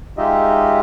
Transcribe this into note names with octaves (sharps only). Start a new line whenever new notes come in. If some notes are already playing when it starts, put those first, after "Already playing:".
G#3 D#4 F4 G4 D#5 E5